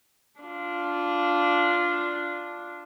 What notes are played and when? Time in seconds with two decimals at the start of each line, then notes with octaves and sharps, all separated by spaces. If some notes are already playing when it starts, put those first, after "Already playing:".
0.41 D4 F4